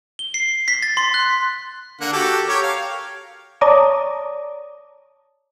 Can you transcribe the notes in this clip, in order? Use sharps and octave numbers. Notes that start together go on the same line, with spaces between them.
G7
C7
B6
A6
C6
F#6
D3 A#3 F#5
F#4 G4 A4
G4 A#4 C#5
F5
C#5 D5 A5 A#5 D6 D#6